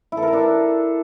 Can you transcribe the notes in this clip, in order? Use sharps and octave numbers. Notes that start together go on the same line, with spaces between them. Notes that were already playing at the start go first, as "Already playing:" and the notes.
E4
A4
A#4
A4
D4